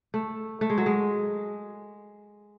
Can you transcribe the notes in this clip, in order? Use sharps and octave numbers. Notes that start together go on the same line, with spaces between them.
A3
A3
G#3
F#3
G#3